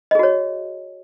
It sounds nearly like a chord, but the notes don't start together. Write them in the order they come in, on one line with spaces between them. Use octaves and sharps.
D#5 G#4 F#4 C#5